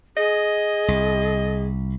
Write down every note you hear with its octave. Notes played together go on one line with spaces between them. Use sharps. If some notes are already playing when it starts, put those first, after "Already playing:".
G#4 D#5
C2